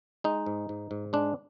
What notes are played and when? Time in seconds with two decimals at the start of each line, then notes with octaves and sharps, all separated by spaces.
0.24 G#3 D#4
0.46 G#2
0.69 G#2
0.91 G#2
1.13 G#3 D4